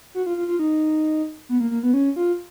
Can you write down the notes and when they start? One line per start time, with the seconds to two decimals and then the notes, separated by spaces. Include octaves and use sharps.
0.14 F#4
0.26 F4
0.37 F4
0.48 F4
0.59 D#4
1.49 B3
1.60 A#3
1.71 A#3
1.83 B3
1.94 C#4
2.16 F4